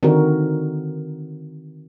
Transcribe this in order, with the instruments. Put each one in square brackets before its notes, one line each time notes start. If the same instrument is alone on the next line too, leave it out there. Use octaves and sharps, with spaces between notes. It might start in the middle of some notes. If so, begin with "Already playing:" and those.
[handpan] D3 D#3 C4 F#4 A#4